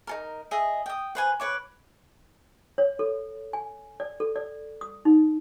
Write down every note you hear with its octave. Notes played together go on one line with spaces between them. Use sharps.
D#4 A4 A#4
G#4 D#5 E5
G5 D#6
B4 C5 G#5
B4 C#5 D6
C#5
A4
G#5
D5
A4
D5
D#6
D#4